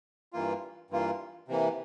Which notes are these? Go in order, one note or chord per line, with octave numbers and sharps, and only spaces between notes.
G2 E3 A#3 F4
G2 E3 A#3 F4
C3 E3 A#3